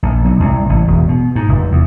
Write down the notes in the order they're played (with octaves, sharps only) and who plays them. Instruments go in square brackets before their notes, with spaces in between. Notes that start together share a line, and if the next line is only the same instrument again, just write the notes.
[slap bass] A#1
B1
C2
A1
E1
B2
G#2
F1
E2